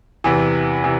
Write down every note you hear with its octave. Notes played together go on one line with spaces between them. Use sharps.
E2 C3 E3
C3 E3